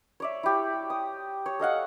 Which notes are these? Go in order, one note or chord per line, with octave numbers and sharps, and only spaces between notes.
C#5 D5 E5
E4 G4
D#6
C#5
A4 D#5 F5 F#5